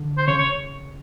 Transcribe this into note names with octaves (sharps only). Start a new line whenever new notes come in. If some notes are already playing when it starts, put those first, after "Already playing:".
Already playing: D3
C5
C#3 C#5
C#5